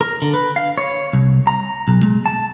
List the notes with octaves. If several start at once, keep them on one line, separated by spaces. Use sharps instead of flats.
A#4
D3
B4
F5
C#5
C2
A#5
B1
G#3
A5